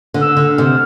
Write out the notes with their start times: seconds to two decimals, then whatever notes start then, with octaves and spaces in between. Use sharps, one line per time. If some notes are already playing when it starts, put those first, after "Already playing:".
0.14 D3
0.22 E6
0.37 D3
0.50 F6
0.58 C3